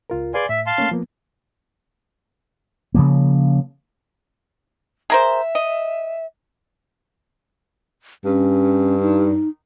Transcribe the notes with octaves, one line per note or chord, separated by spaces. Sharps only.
C#2 F4 A#4
G#4 B4 D5 F5 G#5 C6
A2 E5
F5 A5 C6
A3 A#3 C#4
F3 A#3 B3
C#3 F3 A#3
G#4 A#4 C5 E5
D#5
G2 C#4
D#4